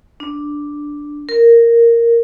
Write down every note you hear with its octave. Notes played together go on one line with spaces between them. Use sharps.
D4
A#4